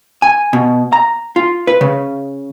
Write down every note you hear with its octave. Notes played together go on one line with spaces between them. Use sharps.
G#5
B2
A#5
F4
B4
C#3